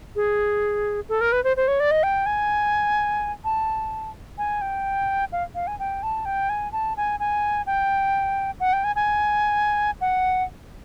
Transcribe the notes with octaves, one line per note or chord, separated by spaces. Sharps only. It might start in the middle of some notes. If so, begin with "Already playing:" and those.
G#4
A4
A#4
B4
C5
C5
C#5
D5
D#5
G5
G#5
A5
G#5
G5
F5
F5
G#5
G5
A5
G5
G#5
A5
G#5
G#5
G5
F#5
G5
G#5
G#5
F#5